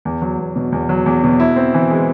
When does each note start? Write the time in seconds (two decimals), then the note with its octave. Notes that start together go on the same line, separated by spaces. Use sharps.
0.05 E2
0.22 F#3
0.39 E2
0.56 B2
0.72 E2
0.89 F#3
1.06 E2
1.24 B2
1.40 E4
1.56 C4
1.74 E3
1.91 G#3